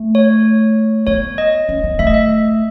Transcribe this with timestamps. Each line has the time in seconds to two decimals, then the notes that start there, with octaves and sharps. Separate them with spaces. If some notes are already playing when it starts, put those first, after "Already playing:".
Already playing: A3
0.15 C#5
1.07 B3 C#5
1.38 D#5
1.69 C#4
1.84 B3
1.99 A3 E5
2.07 D#5
2.14 E5